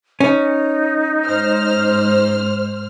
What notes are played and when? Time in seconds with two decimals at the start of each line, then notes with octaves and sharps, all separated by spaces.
0.20 C#4 D#4
1.25 G#2 C5 F6